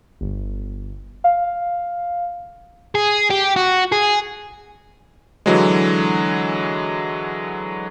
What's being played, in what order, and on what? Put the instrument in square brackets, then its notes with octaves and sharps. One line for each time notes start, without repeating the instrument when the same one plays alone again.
[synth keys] G1
F5
[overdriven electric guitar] G#4
G4
F#4
G#4
[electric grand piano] D3 E3 F#3 G#3